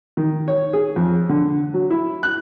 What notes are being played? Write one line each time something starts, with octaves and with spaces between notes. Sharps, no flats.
D#3
C#5
G#4
F2
D3
F#3
E4
F#6